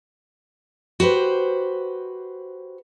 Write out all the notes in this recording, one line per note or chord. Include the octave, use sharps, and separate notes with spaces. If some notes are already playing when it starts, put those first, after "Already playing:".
F#4 G4 B4 C5